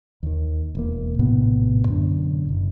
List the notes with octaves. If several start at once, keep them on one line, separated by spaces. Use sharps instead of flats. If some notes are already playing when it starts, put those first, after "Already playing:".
D#2 D#3
E1 A#3
A#1 A2 C3 B3
F#2 B2 D3 D4
F#1